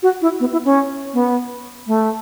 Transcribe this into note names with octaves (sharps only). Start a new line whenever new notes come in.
F#4
E4
B3
E4
C#4
B3
A3